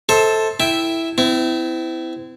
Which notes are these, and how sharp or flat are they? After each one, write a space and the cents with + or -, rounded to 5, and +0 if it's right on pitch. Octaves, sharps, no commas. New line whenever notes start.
A4 +0 C5 +10 E5 -40
E4 +0 E5 -5 G5 +0
C4 -35 E4 +0